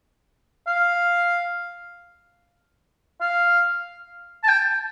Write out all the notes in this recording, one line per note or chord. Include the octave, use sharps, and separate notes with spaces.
F5
F5
A5
G5